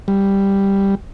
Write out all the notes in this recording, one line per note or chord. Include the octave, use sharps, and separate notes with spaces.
G3